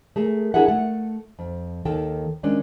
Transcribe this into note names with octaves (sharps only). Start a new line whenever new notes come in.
A3 G#4 A#4
D4 E4 G#4 A#4 E5 F#5
A3 F#5
F2
D#2 D#3 A4 G5
D#3 G#3 C#4 D4